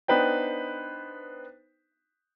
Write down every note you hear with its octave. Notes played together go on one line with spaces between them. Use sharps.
B3 D4 D#4 B4 C5 G5